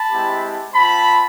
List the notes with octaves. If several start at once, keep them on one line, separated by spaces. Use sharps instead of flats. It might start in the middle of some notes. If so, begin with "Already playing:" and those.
Already playing: A5 B5
G#3 C4 E4 G4
C4 F4 A5 B5